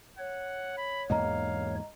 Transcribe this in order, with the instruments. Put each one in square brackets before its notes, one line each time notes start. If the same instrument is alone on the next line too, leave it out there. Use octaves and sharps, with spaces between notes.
[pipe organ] C#5 [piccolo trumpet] F#5
[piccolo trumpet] B5
[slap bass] E2 G#2 A#3 [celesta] D#5 A#5 [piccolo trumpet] F5